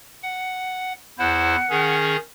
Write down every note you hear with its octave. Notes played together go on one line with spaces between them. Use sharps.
F#5
E2 E4 C5 F#5
D#3 C#4 G#4